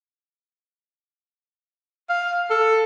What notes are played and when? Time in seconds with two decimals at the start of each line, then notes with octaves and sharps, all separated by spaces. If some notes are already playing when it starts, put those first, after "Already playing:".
2.09 F5
2.50 A4